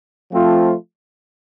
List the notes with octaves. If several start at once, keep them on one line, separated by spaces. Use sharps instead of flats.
F3 A3 C4 F4